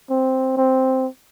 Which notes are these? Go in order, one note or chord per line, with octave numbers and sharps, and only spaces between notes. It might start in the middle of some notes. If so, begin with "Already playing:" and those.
C4
C4